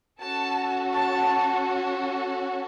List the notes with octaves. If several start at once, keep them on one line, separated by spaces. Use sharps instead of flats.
C#4 F#4 A4 A5
A5